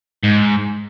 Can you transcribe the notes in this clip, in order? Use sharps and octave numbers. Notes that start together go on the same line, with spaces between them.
G#2